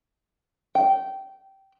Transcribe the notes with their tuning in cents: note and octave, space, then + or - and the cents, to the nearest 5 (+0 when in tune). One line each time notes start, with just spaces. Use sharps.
G5 -15